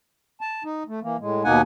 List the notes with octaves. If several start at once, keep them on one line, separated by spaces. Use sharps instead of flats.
A5
D#4
A3
E3 A#3
A2 G#3
D#2 B2 A#3 D#4 F#5 G#5